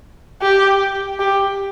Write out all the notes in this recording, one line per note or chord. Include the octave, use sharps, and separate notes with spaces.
G4
G4